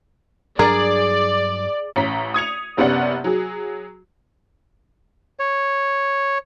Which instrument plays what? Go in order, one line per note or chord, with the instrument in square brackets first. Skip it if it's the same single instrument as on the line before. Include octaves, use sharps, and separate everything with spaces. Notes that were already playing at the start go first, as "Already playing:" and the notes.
[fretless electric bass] G2 F#3 D4 [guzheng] G#4 [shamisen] A#4 [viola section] D5
[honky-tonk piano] A1 C#4 A#5 B6
D#6 G#6 C#7 F7
F#1 C3 B3 C#4 D5 F#5
F#3 G#4
[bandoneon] C#5